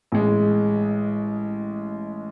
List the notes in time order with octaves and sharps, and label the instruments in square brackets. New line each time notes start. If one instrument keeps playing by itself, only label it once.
[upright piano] A1 G#3